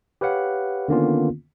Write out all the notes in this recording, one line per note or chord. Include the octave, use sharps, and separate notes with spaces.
G4 B4 C#5 F5 F#5
D3 D#3 A#3 B3 C#4 F4